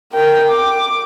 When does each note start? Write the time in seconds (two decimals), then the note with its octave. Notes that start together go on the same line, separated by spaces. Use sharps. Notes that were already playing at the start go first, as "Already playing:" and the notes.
0.12 A#4 G5
0.50 D6